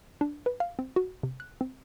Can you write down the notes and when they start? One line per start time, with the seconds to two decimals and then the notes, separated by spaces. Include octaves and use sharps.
0.21 D4
0.46 B4
0.60 F5
0.79 C4
0.96 F#4
1.23 C3
1.40 F#6
1.61 C4